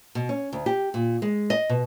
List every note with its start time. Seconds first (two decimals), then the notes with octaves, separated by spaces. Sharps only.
0.15 B2
0.29 C#4
0.53 D2
0.66 G4
0.94 A#2
1.22 G#3
1.50 D#5
1.69 B2